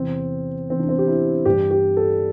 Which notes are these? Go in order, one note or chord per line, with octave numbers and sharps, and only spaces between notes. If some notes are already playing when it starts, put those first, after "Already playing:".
Already playing: E2 C3 E3 C4
E2 C3 E3 C4
D4
C4
G4
E4
G2 E3 G4
G4
A4